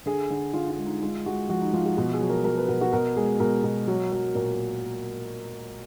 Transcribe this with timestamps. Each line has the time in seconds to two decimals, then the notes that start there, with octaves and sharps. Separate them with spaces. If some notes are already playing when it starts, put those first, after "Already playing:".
0.06 D3 G#4
0.30 D3
0.53 D3 F4
0.70 F4
0.78 G#3
0.86 D#4
1.02 G#3 F4
1.26 G#3 F#4
1.49 F3 F#4
1.61 D#4
1.74 F3 F4
1.86 F#4
1.97 B2 F#4
2.13 G#4
2.21 F#3
2.29 A#4
2.44 F#3 A#4
2.57 B4
2.68 B2 A#4
2.81 F#4
2.93 B2 A#4
3.16 G#3 G#4
3.40 B2 A#4
3.64 B2
3.88 F#3
4.12 F#3
4.35 A#2 A#4